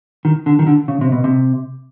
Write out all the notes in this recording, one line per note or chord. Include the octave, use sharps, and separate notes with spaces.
D#3
D3
D#3
D3
C#3
C3
B2
C3